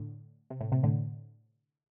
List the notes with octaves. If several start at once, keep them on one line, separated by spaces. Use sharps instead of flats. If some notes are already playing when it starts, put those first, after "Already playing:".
Already playing: A2 D3
C3
A2
C3
A2 D3